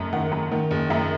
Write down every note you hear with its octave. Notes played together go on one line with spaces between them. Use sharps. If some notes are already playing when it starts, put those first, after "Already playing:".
Already playing: F#1 F#2 A3
D#3 F#5
F#2
D#3
F#1
F#2 E5